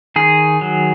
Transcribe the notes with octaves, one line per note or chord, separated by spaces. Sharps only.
D#3 G#4
F#3